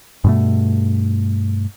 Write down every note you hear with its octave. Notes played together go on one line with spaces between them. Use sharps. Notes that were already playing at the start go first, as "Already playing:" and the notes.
G2 B2 A3